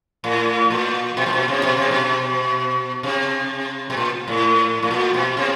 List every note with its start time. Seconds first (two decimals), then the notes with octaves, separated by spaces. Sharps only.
0.24 A2
0.70 A#2
1.17 B2
1.26 A#2
1.33 B2
1.48 C3
1.63 B2
1.77 C3
1.91 B2
3.03 C3
3.90 B2
3.97 A#2
4.28 A2
4.83 A2
4.91 A#2
5.14 B2
5.37 C3